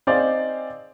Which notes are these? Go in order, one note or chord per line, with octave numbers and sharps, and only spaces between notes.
C4 D#4 G#4 C5 D5 F5